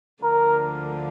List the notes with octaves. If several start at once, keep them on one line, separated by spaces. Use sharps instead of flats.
D2 D3 F3 A#3 D4 A#4